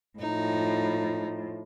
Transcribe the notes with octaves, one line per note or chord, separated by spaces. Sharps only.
A2 F3 D#4